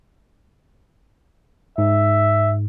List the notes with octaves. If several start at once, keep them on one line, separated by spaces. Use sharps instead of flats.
G#2 E5